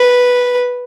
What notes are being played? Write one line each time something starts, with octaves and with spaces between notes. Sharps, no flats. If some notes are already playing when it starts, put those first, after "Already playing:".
Already playing: B4